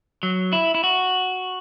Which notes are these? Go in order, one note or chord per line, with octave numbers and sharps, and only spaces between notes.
F#3
E4
E4
F#4